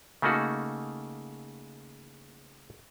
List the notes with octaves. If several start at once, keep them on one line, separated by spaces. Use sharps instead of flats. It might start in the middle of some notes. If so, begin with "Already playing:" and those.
C#3 A3 A#3 D#4 F#4